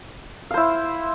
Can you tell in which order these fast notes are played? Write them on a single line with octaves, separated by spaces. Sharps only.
F5 C5 E4